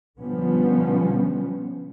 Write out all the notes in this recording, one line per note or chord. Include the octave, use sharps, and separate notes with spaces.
B2 D3 F3 G3 B3 C#4